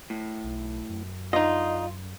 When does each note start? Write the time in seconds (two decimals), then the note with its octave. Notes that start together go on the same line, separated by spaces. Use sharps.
0.10 A2
0.44 B1
0.90 F#2
1.33 D3 D#4 F4 D#5